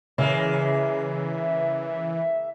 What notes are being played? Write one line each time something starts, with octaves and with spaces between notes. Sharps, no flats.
C#3 E3 G#3 A#3 E5